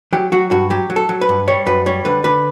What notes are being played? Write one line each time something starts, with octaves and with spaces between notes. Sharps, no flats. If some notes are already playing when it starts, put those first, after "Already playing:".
F#3 G4
F#3 F#4
G2 F#4
F#3 G4
F#3
A4
F#3
B4
G2
G3 C#5
F#2 B4
G3 C#5
D3 B4
D3 B4